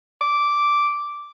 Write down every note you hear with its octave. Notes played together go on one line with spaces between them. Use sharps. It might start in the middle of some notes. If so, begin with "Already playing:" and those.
D6